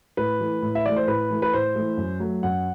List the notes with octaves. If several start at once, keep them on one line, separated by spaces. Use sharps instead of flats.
A2 B4
E3 A3
A2
E5
E3 A3 D5
C5
A2 B4
E3 A3
B4
A2 C5
E3 A3
F#2
F#3 A3
F#2 F#5